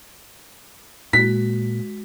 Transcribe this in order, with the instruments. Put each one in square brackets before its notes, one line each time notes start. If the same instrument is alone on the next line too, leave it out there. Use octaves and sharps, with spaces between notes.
[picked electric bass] A#2 [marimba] G#3 F#4 [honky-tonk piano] B6